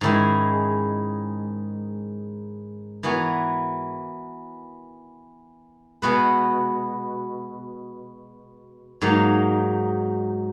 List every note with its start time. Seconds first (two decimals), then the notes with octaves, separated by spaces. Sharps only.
0.01 G#2 D#3 G#3 C#4 E4
3.03 E3 B3 F#4 A#4 C#5
6.02 B2 G#3 B3 F#4 B4
9.01 G#2 F#3 A#3 D#4